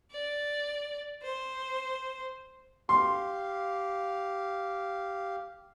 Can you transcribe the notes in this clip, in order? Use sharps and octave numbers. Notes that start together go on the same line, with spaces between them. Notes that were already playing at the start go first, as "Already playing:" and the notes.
D5
C5
G4 F5 C6